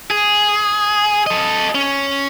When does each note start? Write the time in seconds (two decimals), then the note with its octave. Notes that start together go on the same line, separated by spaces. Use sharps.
0.11 G#4
1.26 A4 D#5
1.75 C#4